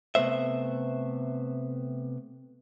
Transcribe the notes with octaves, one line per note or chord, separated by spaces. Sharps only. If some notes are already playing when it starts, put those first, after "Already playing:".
C3 A3 B3 C5 E5